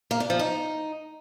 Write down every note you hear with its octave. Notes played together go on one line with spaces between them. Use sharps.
A#3
D4
F3
D#4